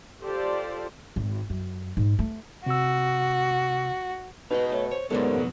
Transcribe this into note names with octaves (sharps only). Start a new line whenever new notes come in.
F4 G4 A4 C5 D5
G#1
F#2
G#2
A3
C3 F#4 E6
B2 D#4 G#4 B4 D#5
A3 C#5
C5 C#5
D#2 G#2 D3 F#3 G#3 A3 B3 C#4
F2 B2 F#3